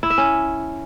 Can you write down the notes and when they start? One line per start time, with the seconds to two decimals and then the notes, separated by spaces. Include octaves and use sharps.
0.03 E4
0.10 E5
0.18 C#4